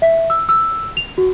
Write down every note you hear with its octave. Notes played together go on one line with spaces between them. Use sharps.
E5
E6
E6
F7
F#4